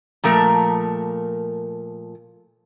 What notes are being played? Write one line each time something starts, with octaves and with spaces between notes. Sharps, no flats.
A#2 F3 A3 A#4